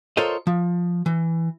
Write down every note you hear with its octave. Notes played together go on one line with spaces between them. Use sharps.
F4 A4 A#4 C5 C#5 D#5
F3
E3